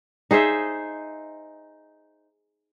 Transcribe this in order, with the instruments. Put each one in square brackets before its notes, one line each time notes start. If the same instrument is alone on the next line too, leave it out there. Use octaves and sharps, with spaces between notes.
[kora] D#4 G#4 C5 E5